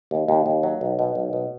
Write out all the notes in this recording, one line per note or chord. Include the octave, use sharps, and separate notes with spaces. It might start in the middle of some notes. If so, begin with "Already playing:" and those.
D#2
D#2
D#2
F#3
B1
B2
B1
B2